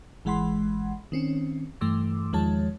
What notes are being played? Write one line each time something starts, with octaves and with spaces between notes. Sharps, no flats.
G#1 E3 G#3 F#5 B5 C6
D#3 C4 C#4
G2 E3 A3 C6 D6 E6
E2 D#3 F3 G#3 C#5 A5